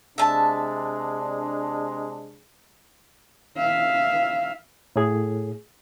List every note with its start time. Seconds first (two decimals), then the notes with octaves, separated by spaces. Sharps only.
0.18 C3 G#3 D4 E5 A5
3.58 E5 F5
4.96 A2 G#4